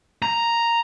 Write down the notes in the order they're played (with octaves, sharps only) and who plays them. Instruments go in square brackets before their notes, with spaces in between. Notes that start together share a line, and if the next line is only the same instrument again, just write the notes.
[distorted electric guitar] A#5